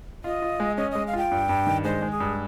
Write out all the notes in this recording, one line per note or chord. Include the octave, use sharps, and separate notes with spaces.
F4 D#5
F4
G#3
C#4 D#5
G#3 D#5
F5
F4 G5
G2
G2
D#3
G#3 C5
G#3
G#4
G2